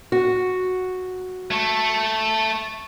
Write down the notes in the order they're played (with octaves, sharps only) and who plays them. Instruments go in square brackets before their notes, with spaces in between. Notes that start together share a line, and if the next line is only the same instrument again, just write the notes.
[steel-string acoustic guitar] F#4
[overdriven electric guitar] A3